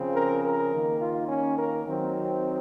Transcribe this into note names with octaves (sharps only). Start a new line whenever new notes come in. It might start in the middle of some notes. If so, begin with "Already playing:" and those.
Already playing: C#3 F3 C4
A#4
A#4
D#3 A#3
F4
C#4
A#4
D#3 F#3 C4